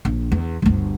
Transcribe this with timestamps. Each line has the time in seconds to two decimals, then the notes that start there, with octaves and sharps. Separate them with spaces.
0.05 A#1
0.32 E2
0.62 G1 D2